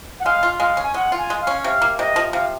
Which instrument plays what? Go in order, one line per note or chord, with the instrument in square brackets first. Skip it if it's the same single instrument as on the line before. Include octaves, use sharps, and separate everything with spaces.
[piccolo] F#5
[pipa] G#3 [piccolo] F5
[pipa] F4
[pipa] G#3 [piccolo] F5
[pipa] C#4
[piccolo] G#5
[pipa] G#3 [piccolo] F#5
[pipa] F4
[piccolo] G#5
[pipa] G#3
[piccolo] F5
[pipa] C#4
[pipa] C3 [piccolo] F5
[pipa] A#3
[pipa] C3 [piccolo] D#5
[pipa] F3
[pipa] C3 [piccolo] F5